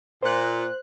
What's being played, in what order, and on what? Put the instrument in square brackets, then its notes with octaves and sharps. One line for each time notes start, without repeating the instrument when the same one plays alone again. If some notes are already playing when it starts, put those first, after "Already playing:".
[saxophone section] A#2 [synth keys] C5 F#6